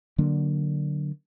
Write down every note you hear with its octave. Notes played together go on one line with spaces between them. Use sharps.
D3 F#3 A#3 D4